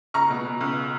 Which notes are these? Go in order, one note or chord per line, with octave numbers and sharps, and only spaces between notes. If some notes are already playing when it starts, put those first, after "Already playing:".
C#2 A#5 C#6
B2
B2
C#2